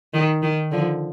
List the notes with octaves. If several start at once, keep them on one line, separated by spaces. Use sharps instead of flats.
D#3
D#3
D3 F3